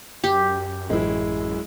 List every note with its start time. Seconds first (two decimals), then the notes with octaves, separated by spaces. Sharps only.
0.24 F#2 G4
0.90 A1 G#3 E4